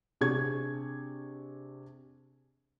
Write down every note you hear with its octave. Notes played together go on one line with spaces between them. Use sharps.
C3 D4 G#4 C#6 G#6